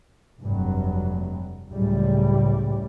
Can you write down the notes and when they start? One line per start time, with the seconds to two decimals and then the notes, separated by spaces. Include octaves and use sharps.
0.41 F1 G2 F#3
1.71 C#2 F#2 A2 G3